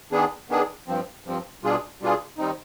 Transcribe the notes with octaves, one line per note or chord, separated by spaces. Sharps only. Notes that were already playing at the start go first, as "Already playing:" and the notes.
D#3 B3 D4 G#4
D#3 B3 D4 G#4
G2 F3 C4
G2 F3 C4
B2 G3 D4 F4 G#4
B2 G3 D4 F4 G#4
D#3 G3 C4 D#4